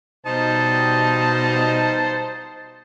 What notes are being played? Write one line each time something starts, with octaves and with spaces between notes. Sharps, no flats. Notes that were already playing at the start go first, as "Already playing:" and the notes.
B2 G3 D#4 C5 A5